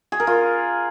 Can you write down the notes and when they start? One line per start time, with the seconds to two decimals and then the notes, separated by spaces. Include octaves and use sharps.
0.12 G#4
0.20 A#4
0.27 F4